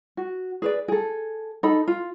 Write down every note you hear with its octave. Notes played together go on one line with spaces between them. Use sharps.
F#4
G#4 B4 D5
G#4 A4
D#4 A4 B5
F4